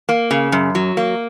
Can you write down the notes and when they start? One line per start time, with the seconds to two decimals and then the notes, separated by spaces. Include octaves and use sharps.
0.09 A#3
0.31 C#3
0.52 F#2
0.75 F#3
0.97 A#3